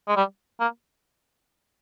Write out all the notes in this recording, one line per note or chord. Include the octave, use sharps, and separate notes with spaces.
G#3
G3
A#3